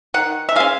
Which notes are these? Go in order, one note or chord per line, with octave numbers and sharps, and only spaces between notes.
D#3 F#5
E5
G#3 C#4 F5